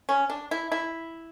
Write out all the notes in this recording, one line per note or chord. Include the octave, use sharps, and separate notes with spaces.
C#4
D4
E4
E4